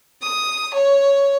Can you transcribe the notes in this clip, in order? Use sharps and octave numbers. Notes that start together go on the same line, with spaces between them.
D#6
C#5